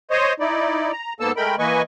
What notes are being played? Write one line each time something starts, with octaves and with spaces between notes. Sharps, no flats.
C5 C#5 D#5
D#4 E4 D5
A#5
G#2 A#3 B3 A4 A5 E6
G#3 A3 A#4 G5 B5
E3 A#3 B4 D#5 G#5 C#6